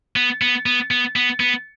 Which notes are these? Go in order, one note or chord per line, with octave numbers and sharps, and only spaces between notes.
B3
B3
B3
B3
B3
B3